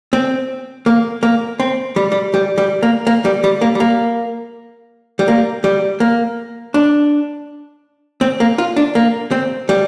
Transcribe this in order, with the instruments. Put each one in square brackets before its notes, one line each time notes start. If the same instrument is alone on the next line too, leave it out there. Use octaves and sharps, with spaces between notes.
[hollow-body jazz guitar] C4
A#3
A#3
C4
G3
G3
G3
G3
A#3
A#3
G3
G3
A#3
G3
A#3
G3
A#3
G3
A#3
D4
C4
A#3
F4
D4
A#3
C4
G3